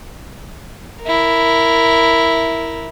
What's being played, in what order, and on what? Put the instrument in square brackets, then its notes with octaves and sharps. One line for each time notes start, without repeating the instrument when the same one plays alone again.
[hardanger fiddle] E4 A#4